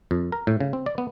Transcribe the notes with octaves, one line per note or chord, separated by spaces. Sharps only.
F2
A#4
A2
C#3
C4
D5
B3